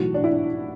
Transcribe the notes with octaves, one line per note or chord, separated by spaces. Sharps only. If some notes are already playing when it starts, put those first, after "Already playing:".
Already playing: B1 A2 E3 F#4
D4
E4